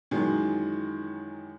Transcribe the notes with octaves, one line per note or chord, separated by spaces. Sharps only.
F#2 D#3 E3 F#3 G#3